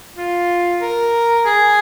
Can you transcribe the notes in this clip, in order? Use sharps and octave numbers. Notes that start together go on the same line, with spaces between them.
F4
A#4
G#4